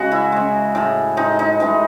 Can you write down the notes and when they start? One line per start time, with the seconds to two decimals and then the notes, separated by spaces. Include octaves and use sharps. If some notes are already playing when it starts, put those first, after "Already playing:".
Already playing: C#3 G#3 F#4
0.12 E4
0.32 C#3 G#3
0.75 A2 G#3
1.17 A2 G#3 D#4
1.39 D#4
1.60 A2 E3 G#3